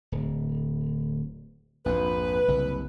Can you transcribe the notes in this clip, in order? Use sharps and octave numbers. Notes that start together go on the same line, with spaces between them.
D1
A#1 F2 G#2 B4
F#1 C2